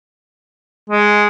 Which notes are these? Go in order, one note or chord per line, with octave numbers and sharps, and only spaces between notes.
G#3